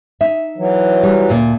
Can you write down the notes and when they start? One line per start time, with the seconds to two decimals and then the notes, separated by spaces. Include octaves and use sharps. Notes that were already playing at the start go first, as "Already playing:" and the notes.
0.21 D#4 E5
0.58 E3 F#3
1.03 G3
1.29 D2 A#2 A#4